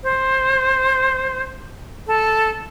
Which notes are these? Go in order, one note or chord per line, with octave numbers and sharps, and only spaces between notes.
C5
A4